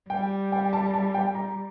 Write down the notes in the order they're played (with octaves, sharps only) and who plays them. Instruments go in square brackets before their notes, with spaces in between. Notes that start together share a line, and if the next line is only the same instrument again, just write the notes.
[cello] G3 [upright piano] G5
[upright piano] G5
A5
A5
G5
A#5